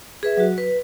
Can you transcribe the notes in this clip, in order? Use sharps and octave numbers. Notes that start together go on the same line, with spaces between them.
G#4 B4 E5
F#3 F#4
B4